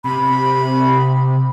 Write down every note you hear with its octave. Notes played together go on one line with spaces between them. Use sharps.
C3 B5